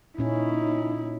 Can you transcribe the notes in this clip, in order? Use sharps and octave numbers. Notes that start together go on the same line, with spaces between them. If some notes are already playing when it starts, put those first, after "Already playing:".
A#2 C#4 D#4 E4